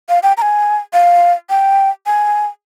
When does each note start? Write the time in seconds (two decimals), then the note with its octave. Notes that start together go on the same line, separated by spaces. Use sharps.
0.09 F5
0.23 G5
0.37 A#5
0.42 G#5
0.93 F5
1.50 G5
2.06 G#5